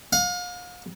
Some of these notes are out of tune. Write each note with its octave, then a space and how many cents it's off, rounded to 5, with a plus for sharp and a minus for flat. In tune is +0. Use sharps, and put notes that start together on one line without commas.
F5 +40